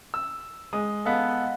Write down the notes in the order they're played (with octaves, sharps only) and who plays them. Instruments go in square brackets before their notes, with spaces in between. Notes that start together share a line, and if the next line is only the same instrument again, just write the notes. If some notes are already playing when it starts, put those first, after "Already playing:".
[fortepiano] E6
[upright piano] G#3 [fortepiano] D#6
[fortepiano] B3 A4 [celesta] D#5 F5 F#5